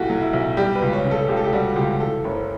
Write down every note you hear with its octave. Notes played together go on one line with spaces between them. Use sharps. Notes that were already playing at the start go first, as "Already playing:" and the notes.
Already playing: B1 A2 A3 F#4 G4
F#3
E4
B1
G3 G4
B4
C#2
C#5
C#3
A4
C#2 G4
A4
G4
G3 F#4
C#2 G4
E3 A4
F#1 C#5